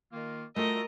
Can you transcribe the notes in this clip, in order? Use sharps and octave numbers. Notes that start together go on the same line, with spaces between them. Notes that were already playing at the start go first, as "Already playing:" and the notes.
D#3 A#3 F4
A3 F4 F#4 A4 A#4 D#5 G5